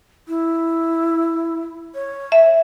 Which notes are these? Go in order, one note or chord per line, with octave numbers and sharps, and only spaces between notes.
E4
C#5
E5